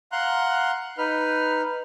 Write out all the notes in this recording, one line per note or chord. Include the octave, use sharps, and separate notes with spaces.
F5 F#5 A#5 C6 F#6
D#4 B4 F6